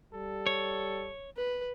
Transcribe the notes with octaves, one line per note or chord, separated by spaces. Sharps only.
G3 A4
C#5
B4